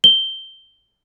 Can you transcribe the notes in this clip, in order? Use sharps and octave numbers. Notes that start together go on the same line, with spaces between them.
G7